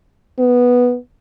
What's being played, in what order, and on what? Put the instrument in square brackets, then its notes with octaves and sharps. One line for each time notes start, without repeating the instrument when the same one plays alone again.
[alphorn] B3